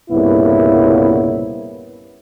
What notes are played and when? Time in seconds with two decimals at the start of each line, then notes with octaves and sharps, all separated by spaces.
0.11 C2 G2 A#2 C#3 B3 E4